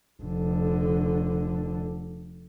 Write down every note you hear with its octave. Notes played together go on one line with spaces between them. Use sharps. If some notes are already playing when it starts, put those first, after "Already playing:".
F1 D3